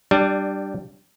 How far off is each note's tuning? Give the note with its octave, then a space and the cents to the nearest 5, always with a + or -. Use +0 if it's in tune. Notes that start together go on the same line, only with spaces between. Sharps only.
G3 -10 D4 +15